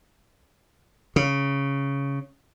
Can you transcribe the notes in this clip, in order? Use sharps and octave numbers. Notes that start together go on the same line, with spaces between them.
C#3